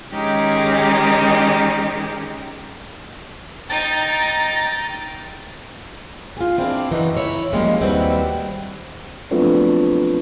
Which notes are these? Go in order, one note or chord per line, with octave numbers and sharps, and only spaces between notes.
D#3 G#3 C#4 D#4 G4 G#4
D#4 G5 A#5 A6
F4 G#4
C4 D4 E4 D5 E5 F5
F#2 C#3 E3 D#4 F#4
E4 C#5
F3 G3 G#3 A#3 C#4
D#2 G3 C4 E4 F#4 B4
F3 F#3 A3 B3 C4 D4